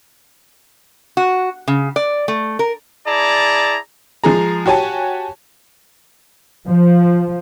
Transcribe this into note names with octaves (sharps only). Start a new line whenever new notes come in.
F#4
C#3
D5
A3
A#4
E4 G#4 D5 A5 A#5
F3 G#3 G#4 A#5
F#4 G4 C#5 G#5 A5
F3